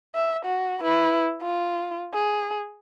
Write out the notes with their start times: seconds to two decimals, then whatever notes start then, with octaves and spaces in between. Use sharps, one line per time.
0.15 E5
0.45 F#4
0.81 E4 B4
1.41 F4
2.14 G#4